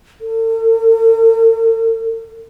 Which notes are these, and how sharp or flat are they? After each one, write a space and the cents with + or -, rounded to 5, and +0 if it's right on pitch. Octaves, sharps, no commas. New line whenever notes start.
A4 +45